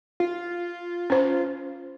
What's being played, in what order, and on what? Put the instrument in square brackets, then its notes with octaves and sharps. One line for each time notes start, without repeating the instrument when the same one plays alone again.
[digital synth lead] F4
[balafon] C#4 C5